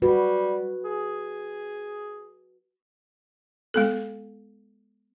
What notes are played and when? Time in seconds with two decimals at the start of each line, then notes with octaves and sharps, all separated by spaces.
0.02 G3 F#4 B4
0.84 G#4
3.74 G#3 B3 A4